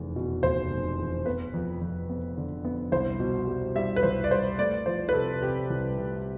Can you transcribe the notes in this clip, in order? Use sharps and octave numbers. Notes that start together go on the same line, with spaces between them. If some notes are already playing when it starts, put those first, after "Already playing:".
Already playing: F1 E2
B2
F1 C5
F1
E2
B3 B4
F2
F2
B3
D3
B3
C2 C5
B2
G3
G3 E5
B4
C2 C5
D5
G3 C5
A3 D5
F3 C5
B4
C3 A4
C3 G4
C2
C3